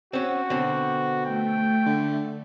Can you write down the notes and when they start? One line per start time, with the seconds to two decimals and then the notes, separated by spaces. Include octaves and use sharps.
0.13 C4 C#4 F#4
0.50 B2 D3 C4
1.25 A3 G5
1.86 D3